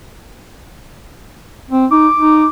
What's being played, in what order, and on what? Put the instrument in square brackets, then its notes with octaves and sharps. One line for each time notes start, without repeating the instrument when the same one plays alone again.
[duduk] C4
[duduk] D#4 [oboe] D6
[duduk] D#4